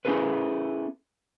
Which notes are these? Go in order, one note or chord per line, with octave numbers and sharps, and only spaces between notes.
B3 C#4 E4 G#4 A4 B4